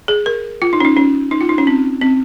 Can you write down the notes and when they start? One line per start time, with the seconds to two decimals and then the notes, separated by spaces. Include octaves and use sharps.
0.08 G#4
0.26 A#4
0.62 F4
0.73 D#4
0.80 C#4
0.85 D#4
0.97 C#4
1.31 D#4
1.41 F4
1.49 D#4
1.58 C#4
1.67 C4
2.01 C4